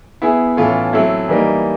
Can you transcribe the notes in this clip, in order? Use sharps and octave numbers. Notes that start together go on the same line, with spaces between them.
B3 E4 G#4
A2 E3 A3 C#4 F4
F#3 A3 C4 E4
E3 G3 A#3 D#4